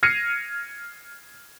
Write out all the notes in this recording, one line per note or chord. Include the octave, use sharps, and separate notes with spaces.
F6 G#6 A#6 C7 C#7 D#7